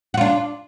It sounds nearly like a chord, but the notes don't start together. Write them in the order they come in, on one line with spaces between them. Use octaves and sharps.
F#4 F4 D4